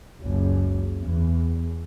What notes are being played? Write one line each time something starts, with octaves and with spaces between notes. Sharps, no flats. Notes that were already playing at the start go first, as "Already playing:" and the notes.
F#1 C#2 F#2
E2